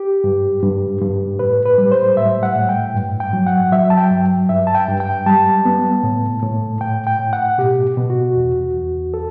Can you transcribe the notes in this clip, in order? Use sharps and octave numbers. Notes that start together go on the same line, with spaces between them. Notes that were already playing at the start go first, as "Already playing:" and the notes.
Already playing: G4
G2
G2
G2
A2 B4
B4
G3
C5
A2 E5
F#5
A2
G5
G2
G5
F#3
F#5
F#3 E5
A5
G5
G2
G2 E5
A5
G5
G2
G5
G3 A5
B3
A2
A2
A2 G5
G5
A2
F#5
B2 G4
B2
F#4
E2
E2
A4